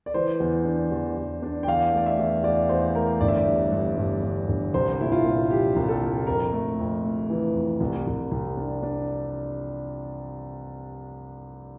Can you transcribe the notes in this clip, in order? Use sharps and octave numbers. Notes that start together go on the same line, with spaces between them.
D5
E3 C5
E2
D4
E2
E2
D4
G5
E2 F5
A3 D5
E5
E2
E2 D5
E2 C5
A3 A#4
G1 D5
E5
D5
G2
G2
G2
G2
G1
C2 C5
A#2 E4
F4
A#2
F3 G4
C2
A4
A#2
F2 A#4
A3
F2
A3
E3
F2
C2
C2
C2
D4
D4